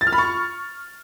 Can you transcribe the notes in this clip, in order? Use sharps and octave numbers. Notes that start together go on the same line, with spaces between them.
A6
F6
B5
C#6